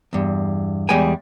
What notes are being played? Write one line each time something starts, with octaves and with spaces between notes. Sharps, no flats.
E2 G2
E2 G3 G#3 G5 G#5